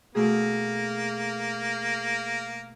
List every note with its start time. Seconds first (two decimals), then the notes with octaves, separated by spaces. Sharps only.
0.15 B2 A3 A#3 G#4